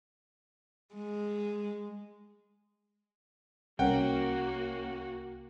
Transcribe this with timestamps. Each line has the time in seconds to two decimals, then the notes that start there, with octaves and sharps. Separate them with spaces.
0.95 G#3
3.79 C2 A#3 C#4 F#4 A#4 F#5 G5